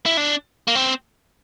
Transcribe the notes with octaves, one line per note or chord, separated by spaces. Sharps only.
E4
D4
A#3
C4